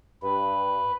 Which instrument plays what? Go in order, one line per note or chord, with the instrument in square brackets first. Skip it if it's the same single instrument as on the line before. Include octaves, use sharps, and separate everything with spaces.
[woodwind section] G2 [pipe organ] B4